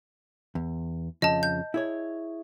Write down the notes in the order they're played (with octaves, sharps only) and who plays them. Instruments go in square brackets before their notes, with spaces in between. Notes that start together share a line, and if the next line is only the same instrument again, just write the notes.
[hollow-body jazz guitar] E2
[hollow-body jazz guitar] F2 C#3 F3 [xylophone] D#5 A5
[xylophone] G6
[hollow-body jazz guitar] E4 G#4 C#5